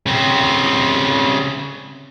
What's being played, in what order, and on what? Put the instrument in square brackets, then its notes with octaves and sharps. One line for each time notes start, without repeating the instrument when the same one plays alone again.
[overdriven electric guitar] C#3 C4